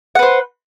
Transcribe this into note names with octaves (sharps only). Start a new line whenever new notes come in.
B4 C5 F#5